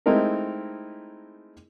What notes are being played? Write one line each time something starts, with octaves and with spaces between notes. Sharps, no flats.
G#3 A3 C4 D#4 E4 A#4